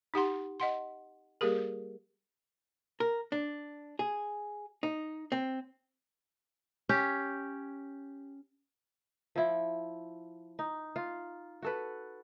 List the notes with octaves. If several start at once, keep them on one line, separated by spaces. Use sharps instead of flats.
D#4 G4 F#5 C6
D#5 F#5 C6
G3 A#3 G4 G#4 A#4
A#4
D4
G#4
D#4
C4
C#4 G4
F3 E4
D#4
F4
F#4 A4 B4